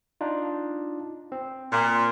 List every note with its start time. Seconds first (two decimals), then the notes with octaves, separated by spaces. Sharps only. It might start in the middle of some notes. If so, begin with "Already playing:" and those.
0.21 D4 D#4 F4
1.32 C4
1.72 A#2